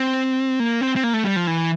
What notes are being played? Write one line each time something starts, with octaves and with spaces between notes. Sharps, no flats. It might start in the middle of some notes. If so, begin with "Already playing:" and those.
Already playing: C4
A#3
C4
C4
A#3
A3
G3
F3
E3